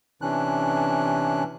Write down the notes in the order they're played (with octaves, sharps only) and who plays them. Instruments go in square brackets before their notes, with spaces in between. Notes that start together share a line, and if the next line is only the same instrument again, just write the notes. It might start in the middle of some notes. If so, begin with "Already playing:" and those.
[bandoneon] C3 E3 C#4 D4 F#6